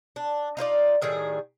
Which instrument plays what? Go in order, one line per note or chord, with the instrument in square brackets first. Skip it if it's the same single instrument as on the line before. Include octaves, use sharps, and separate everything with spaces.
[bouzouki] D4
D#4 F4 C5 D5
A2 D#3 G3 G#4